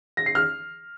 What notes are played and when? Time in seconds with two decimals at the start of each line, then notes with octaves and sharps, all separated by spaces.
0.17 A#6
0.26 C7
0.35 F6